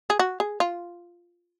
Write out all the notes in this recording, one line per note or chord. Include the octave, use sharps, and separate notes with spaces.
G#4
F#4
G#4
F4